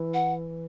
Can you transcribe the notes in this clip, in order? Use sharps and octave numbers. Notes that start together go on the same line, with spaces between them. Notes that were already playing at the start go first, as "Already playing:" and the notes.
Already playing: E3
F#5